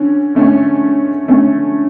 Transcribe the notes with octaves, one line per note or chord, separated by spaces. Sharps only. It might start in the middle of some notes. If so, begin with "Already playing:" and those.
Already playing: D3 C#4
D3 A3 C#4
D3 A3 C#4